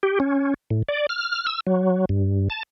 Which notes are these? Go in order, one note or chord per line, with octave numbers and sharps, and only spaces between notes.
G4
C#4
A2
D5
F6
E6
F#3
G2
A5